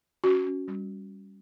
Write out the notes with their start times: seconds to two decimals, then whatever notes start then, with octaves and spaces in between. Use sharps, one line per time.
0.24 C#4 F#4
0.46 C#4
0.68 G3